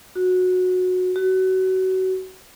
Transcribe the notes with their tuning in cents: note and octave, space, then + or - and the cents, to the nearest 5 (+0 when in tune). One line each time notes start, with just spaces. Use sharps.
F#4 -15
F#4 +25